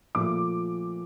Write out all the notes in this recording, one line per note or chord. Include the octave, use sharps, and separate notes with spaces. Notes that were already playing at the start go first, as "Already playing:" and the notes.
A#2 F3 A3 D6